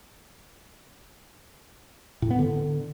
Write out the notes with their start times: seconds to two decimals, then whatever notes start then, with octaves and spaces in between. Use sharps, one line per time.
2.22 A2
2.30 B3
2.39 D3